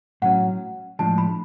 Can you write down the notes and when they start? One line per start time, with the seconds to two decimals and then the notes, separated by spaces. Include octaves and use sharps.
0.22 A2 F#3 C#4 F#5
0.99 A2 F3 G#3 D4 A5
1.18 B5